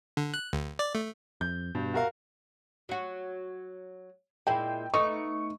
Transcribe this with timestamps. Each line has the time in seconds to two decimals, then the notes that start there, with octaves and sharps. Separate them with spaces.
0.17 D3
0.34 F#6
0.53 D2
0.79 D5
0.95 A3
1.41 F2 G6
1.75 G2 B2
1.94 F#4 A#4 F5
2.89 F#3 F#4
4.47 A#2 G#3 E4 G5
4.94 A3 B3 D#4 C#6